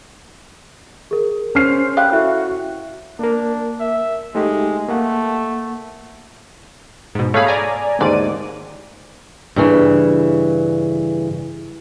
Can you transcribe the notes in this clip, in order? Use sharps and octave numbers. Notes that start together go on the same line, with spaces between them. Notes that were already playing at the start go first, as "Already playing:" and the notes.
G#4 A#4
C#4 C5 F6 C7
G3 G4 F5 F#6
E4 F#4 A4 E5
A#3 D4 A#4
E5
G#3 A3 D#4 G4
A3 A#3 F#5
G#2 B2
A3 G#4 C#5 F5 B5
D5 G#5 A#5
D#2 G#2 D3 D5 D#7
G2 C#3 E3